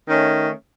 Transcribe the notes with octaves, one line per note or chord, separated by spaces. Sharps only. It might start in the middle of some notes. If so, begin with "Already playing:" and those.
D#3 A3 C#4